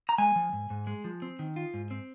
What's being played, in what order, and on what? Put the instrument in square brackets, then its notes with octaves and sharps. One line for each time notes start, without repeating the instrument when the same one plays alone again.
[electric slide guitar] A#5
G#3 G#5
F3
G#2
G#2
G#3
F3
C4
D#3
F4
G#2
C4